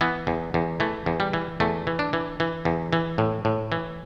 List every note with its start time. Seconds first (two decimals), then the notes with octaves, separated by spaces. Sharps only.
0.01 E3 B3
0.27 E2
0.54 E2
0.80 E3 A3
1.06 E2
1.20 G3
1.33 E3
1.60 E2 A3
1.87 E3
1.99 D4
2.13 E3
2.40 E3
2.65 E2
2.93 E3
3.18 A2
3.45 A2
3.72 E3